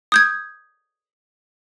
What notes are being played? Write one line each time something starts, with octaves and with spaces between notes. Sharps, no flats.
D#6 G6 G#6